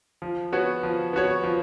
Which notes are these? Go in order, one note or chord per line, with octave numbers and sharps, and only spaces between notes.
F3
B3 F#4 C#5
F3
B3 F#4 C#5
F3